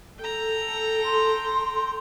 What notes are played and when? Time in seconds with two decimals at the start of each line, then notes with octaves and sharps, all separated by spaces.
0.19 A4 G5 A#5
1.05 C6